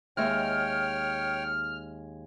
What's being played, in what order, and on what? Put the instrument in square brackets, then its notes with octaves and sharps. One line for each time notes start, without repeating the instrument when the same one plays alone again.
[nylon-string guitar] D#2 G#3 E5 [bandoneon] C#5 G5 [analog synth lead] F6